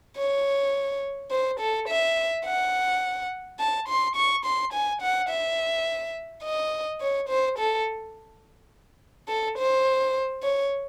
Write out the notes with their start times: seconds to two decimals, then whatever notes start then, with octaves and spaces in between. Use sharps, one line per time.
0.17 C#5
1.31 C5
1.60 A4
1.88 E5
2.45 F#5
3.60 A5
3.88 C6
4.16 C#6
4.45 C6
4.73 G#5
5.01 F#5
5.29 E5
6.43 D#5
7.01 C#5
7.29 C5
7.58 A4
9.28 A4
9.58 C5
10.43 C#5